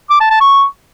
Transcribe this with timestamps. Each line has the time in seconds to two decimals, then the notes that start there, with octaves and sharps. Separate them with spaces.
0.10 D6
0.20 A5
0.31 A5
0.41 C#6